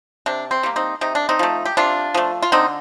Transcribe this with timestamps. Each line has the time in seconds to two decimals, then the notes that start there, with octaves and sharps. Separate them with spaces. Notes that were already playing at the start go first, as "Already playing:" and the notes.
0.26 C3 D4
0.51 C4
0.63 G3 A#3
0.76 C4 D#4
1.01 C3 D#4
1.15 D4
1.29 C4 D#4
1.39 F3 A3
1.65 G4
1.77 C3 D4 F4
2.14 F3 A3
2.42 F4
2.52 D3 C4 D#4